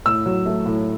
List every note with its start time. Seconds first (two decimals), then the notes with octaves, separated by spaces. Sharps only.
0.05 A2 E6
0.26 F#3
0.46 A3
0.66 A2